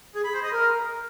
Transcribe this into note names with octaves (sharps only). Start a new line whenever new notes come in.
G#4
B5
C5
D#5
A#4